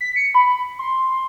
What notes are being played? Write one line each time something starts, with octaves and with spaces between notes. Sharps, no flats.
B6
C#7
B5
C6